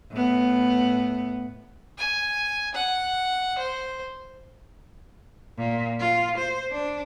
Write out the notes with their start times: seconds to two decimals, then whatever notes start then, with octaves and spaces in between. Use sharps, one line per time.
0.11 A2 B3
1.98 G#5
2.74 F#5
3.58 C5
5.58 A#2
5.99 F4
6.38 C5
6.71 D4